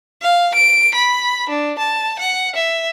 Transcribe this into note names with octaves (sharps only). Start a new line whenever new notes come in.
F5
D7
B5
D4
A5
F#5
E5